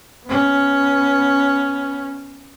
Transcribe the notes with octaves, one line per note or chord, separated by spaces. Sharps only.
B3 C#4